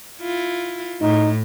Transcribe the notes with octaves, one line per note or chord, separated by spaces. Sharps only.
E4 F4
A2 D#4